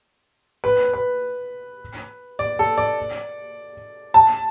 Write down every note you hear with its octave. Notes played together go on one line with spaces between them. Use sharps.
B4
B4
D5
A4
D5
A5